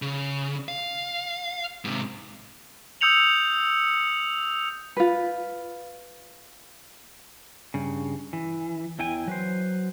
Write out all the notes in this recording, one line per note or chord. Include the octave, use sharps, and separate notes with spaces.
C#3
F5
G#2 C3
D#6 E6 G6 C#7 F7 F#7
F4 B4
G2 C#3
E3
E2 E4 G5 G#5
F#3 B4 C5